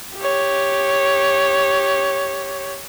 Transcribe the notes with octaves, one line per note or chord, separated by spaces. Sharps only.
G4 C#5